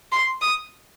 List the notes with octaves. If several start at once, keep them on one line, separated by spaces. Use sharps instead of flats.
C6
D#6